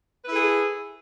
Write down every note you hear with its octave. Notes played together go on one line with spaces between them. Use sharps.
E4 G#4 A4 B4